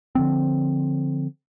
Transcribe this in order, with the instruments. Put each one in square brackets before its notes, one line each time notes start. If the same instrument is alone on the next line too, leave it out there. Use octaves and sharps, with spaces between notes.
[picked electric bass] D3 F3 C4